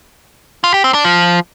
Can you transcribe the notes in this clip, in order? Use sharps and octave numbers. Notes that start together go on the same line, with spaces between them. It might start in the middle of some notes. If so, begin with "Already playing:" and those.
F4
G4
C4
D4
F3